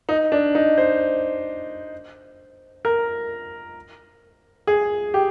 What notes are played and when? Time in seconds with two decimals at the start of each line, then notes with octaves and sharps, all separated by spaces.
0.09 D#4
0.32 D4
0.55 D#4
0.78 C5
2.85 A#4
4.67 G#4
5.14 G4